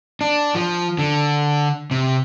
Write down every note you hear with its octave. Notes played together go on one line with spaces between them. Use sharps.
D4
F3
D3
C3